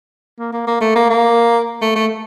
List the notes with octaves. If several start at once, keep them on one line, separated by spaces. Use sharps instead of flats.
A#3
A#3
A#3
A3
A#3
A#3
A3
A3